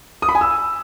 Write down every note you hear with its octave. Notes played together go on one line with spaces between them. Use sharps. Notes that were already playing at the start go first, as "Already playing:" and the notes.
D#6
B5
G#5
E6